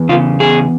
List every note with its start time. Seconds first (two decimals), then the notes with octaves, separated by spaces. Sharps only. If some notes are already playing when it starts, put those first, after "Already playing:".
Already playing: E2
0.09 C#3 F4
0.40 E2 G#4